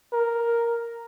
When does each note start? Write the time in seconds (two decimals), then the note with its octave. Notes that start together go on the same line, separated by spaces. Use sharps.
0.13 A#4